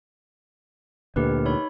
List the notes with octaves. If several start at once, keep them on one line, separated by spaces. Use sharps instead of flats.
D2 A#2 D3 G4 A#4 B4
D#4 C#5 B5